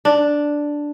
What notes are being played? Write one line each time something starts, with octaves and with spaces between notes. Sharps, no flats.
D4